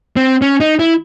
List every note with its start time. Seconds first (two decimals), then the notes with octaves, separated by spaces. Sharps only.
0.16 C4
0.42 C#4
0.60 D#4
0.79 E4